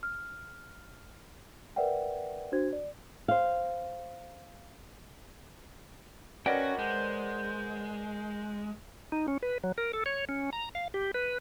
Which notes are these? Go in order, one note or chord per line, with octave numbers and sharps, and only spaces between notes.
F6
A#4 B4 D5 E5 F#5 G5
D4 F#4 C5 G#6
D5
C5 F5
C#4 F#4 A#4 B4 D5 D#5 F#5 G5
G#3 C5
D#4
C#4
B4
F#3
A#4
A4
C#5
C#4
A#5
F5
G4
B4